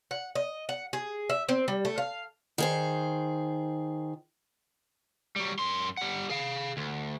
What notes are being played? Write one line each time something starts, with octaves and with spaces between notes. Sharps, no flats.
F#5
D#5
F#5
G#4
E5
C4
G3
A3
F5
D#3 G#4 C5
F#3 G3
F#2 C6
G3 F#5
G#4 F5
D2